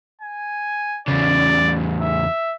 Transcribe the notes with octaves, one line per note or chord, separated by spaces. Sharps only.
G#5
E2 C#3 D5
E5